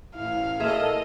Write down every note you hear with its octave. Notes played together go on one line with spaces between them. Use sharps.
A1 E4 F5
A#2 G#4 A4 D#5 E5